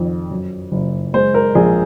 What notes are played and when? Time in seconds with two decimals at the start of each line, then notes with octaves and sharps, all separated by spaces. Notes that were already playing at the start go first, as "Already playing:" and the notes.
Already playing: F2 D#3
0.31 F#2
0.72 F#1
1.14 G#3 C5
1.34 A#4
1.55 A#1 G#4